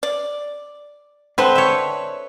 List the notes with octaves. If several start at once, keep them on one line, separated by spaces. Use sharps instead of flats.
D5
D3 C4 A4 B4 C5
C#5 E5